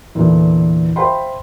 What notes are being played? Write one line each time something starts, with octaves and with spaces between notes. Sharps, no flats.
E2 A#2 D3 E3 B4
C5 E5 F5 G5 B5 C6